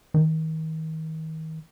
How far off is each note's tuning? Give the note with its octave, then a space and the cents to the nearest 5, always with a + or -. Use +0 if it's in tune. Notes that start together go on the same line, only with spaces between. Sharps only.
D#3 +35